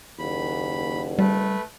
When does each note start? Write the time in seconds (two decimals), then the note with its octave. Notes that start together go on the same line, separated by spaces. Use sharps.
0.19 F#1 D#2 B5
1.19 G3 A3 B4